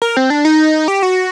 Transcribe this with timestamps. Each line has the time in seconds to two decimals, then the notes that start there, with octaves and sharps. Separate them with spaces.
0.02 A#4
0.17 C4
0.30 D4
0.45 D#4
0.88 G4
1.03 F#4